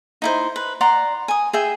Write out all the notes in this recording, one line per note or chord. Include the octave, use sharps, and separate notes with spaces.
D#4 E4 C5
B4
D5 F#5 A#5 C6
G#5 D#6
G#4 E5 G5